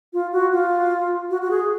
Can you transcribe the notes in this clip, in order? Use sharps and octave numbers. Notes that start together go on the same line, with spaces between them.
F4
F#4
F4
F#4
F#4
G#4